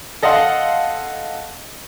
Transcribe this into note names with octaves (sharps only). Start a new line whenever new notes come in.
A4 D#5 F5 F#5 C6